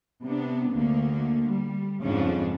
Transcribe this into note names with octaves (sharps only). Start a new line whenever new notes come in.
C3 B3 D4
D2 D3 A#3
G3
F2 G#2 C#3 F3 C#4 D4